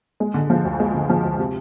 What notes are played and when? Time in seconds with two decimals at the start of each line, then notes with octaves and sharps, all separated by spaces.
0.20 G#3
0.34 D3
0.50 F3
0.65 D2
0.80 G#3
0.94 D3
1.09 F3
1.24 D2
1.39 C3